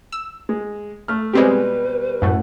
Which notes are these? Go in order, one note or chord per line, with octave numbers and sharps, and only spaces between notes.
E6
G#3
A3 F6
B2 G3 G#3 C4 G4 B4
F#2 A2 A3 F#5